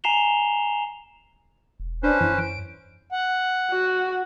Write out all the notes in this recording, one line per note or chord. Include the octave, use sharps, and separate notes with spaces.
G#5 A#5 C7 E7 F7 G7
E1
C#4 D4 B4 C5
F#2 E3
D7
F#5
F#4